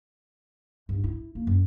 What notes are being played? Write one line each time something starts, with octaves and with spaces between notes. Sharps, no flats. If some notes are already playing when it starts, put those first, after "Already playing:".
G2
E4
A#3
F#2